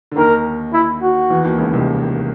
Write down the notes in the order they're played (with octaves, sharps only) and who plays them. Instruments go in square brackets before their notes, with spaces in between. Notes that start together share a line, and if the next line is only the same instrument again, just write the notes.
[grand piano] D3
[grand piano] D#2 D#3 [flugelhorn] A#4
[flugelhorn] E4
F#4
[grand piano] E2 E3
D#2 D#3
C#2 C#3
C2 C3